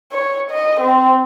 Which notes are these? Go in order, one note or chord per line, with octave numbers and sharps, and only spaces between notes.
C#5
D#5
C4